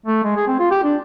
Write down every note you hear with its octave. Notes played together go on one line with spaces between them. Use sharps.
A3
G#3
G#4
C4
F4
G4
D4